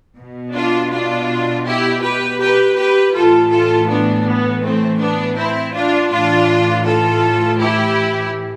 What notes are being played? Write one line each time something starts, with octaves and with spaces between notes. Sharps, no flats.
B2
D4 F4
D4 F4
E4 G4
G4 B4
G4 B4
G4 B4
A2 E3 F4 A4
F4 A4
B3 D4
B3
A3 C4
B3 D4
C4 E4
D4 F4
A2 E3 D4 F4
F4 A4
E4 G4